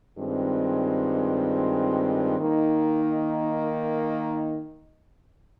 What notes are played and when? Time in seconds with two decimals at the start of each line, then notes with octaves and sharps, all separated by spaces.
0.17 G2 D#3 G#3 C4 F4
2.39 D#3 A#3 D#4